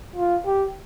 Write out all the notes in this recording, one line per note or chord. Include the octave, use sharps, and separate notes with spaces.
F4
G4